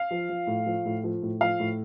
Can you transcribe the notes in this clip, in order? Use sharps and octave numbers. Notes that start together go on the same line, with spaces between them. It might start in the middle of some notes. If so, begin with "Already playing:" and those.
Already playing: F5
F3
F3
A2
F3
A2
F3
A2
F3 F5
A2